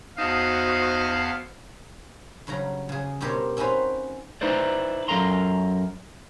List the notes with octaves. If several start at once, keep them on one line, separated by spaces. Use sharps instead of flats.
E2 B3 D#4 F#4 C5 F5 A5
G2 C#3 F#3 A#5
C#3 G#4
G2 B2 G4 A#4 C5 C#5
C4 C#4 D#4 F#4 B4 C5
D#4 E4 B4 C5 D5
F#2 A4 A#4 F5 A#5 C6